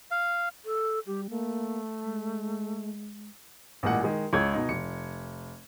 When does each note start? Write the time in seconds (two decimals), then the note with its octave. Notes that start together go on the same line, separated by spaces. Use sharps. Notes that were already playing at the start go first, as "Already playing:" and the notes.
0.11 F5
0.65 A4
1.07 G3 G4
1.30 A3 A#3
2.04 G#3
3.83 A1 A#2 G#3 F#5
4.04 D#3 G#3
4.33 C#2 G#3 C#5 G#6
4.53 B2 D#4
4.69 F1 C#7